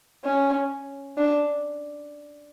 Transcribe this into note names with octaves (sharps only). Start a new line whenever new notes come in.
C#4
D4